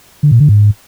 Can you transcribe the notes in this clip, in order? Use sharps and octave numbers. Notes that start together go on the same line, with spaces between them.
D3
A#2
D3
G#2